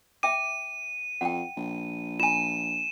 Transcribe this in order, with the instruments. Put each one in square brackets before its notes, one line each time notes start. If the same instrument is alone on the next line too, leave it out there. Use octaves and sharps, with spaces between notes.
[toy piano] E5 G5 D6 [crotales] D#7
[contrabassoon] F2 [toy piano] F#5 G5
[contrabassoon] A#1
[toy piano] F4 G#5 [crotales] D#7 E7